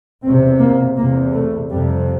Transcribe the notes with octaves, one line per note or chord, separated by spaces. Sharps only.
E2 C3 C4
A#3
E2 C3 A#3
A3
F2 C3 G3